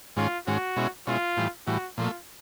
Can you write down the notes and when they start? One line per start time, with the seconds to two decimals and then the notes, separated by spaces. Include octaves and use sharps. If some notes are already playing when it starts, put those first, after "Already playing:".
0.16 G#2 D#3 G#3 C#4 F4
0.47 G#2 D#3 G#3 C#4 F#4
0.76 B2 G#3 C#4 E4
1.07 B2 G#3 C#4 E4 F4
1.37 A2 E3 G3
1.67 A2 E3 G3 F#4
1.97 A#2 F3 A3 F4